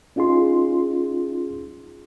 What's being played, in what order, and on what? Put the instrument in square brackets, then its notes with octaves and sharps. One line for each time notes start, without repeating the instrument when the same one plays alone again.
[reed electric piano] C#4 D#4 F4 G#4 C6